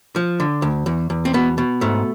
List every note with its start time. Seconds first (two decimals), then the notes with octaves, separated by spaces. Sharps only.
0.16 F3
0.40 D3
0.62 D2
0.86 E2
1.10 E2
1.25 C4
1.34 B2 B3
1.58 B2
1.81 G#2 A3